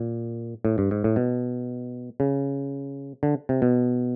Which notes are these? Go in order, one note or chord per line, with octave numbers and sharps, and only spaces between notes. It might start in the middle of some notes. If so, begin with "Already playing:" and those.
Already playing: A#2
A2
G2
G#2
A2
B2
C#3
D3
C3
B2